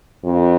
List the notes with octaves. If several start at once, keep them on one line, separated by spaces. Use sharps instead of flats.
F2